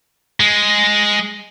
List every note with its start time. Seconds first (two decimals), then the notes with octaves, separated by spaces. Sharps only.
0.40 G#3